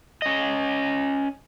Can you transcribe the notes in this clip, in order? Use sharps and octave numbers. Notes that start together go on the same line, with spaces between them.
C#4 D#5